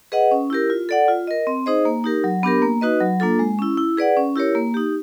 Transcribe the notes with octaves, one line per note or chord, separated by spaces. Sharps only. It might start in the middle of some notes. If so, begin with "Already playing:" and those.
G#4 B4 D#5 F#5
C#4
E4 G4 A#4
F4
A4 D5 F#5
F4
A#4 D#5
C4
D#4 G#4 C5 D#5
A#3
D#4 G4 A#4
F#3
B3 D4 G4 A#4
A#3
D#4 F#4 B4 D#5
F#3
A#3 D4 F4 A4
G#3
C#4 E4
E4
G#4 B4 D5 F#5
C#4
E4 G4 A#4 C#5
A#3
D#4 G4